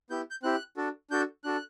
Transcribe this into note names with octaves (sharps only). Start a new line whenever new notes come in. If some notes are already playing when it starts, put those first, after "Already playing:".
B3 E4 G4 G6
G6
C4 E4 G4 F#6
D4 F#4 A4
D4 F#4 A4 G6
D4 F#4 A4 F#6